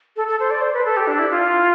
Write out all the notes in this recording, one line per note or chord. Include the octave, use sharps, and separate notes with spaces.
A4
A4
C5
D5
C5
B4
A4
G4
D4
E4
F4